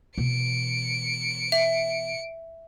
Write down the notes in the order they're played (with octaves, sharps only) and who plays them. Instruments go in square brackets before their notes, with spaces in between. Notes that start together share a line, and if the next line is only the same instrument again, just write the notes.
[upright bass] B2 E3 [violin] C#7 D7
[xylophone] E5